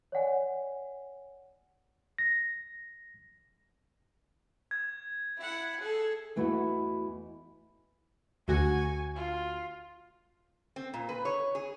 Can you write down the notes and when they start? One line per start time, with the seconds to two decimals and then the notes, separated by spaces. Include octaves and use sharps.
0.12 C#5 D5 F#5 G#5
2.18 A#6
4.71 G#6
5.38 E4 F#5
5.80 G#4 A4
6.36 E2 A3 E4 F#4 D#5 F#5
8.48 D2 F#4 G#5 C#6
9.16 F4
10.76 C4
10.94 A#2
11.09 B4
11.25 C#5
11.55 G#4